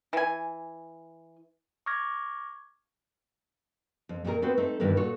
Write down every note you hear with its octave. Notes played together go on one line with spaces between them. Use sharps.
E3 G#5
C#6 D6 F6 G#6 A#6
F2
F2 A#2 A3 D4 G#4 A#4
B3 C4 F#4 B4 C5
A3 C4 D#4 A4
G2 D#3 E3 G3 B3
A#2 F#4 A4 C#5